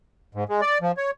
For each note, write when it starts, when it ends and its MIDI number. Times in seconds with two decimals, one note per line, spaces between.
0.35 0.44 44
0.49 0.61 56
0.61 0.78 74
0.81 0.92 53
0.97 1.11 73